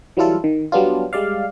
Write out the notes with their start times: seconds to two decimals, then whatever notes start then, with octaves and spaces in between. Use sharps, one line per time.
0.17 E3 F#3 G3 E4 F4 A4
0.44 D#3
0.72 F#3 G3 B3 D4 F4
1.13 G3 G#3 D5 F5